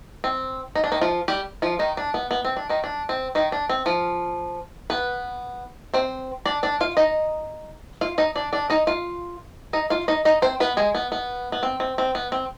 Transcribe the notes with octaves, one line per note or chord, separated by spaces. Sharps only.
C4
D#4
D4
D#3 D#4
F3 F4
G3 G4
F3 F4
D#3 D#4
D4
B3
B3
C4
D4
D#3 D#4
D4
C4
D#3 D#4
D4
C4
F3 F4
B3 B4
C4 C5
D4 D5
D4 D5
F4 F5
D#4 D#5
F4 F5
D#4 D#5
D4 D5
D4 D5
D#4 D#5
F4 F5
D#4 D#5
F4 F5
D#4 D#5
D#4 D#5
C4 C5
B3 B4
G#3 G#4
B3
B3
B3
C4
C4
C4
B3
C4